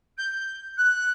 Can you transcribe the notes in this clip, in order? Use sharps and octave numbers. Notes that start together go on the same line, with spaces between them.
G6
F#6